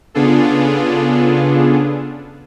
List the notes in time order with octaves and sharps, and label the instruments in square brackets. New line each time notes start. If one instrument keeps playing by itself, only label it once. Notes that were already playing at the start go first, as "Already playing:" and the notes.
[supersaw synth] C#3 B3 D4 F4 G#4 A4